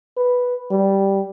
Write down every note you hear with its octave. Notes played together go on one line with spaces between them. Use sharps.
B4
G3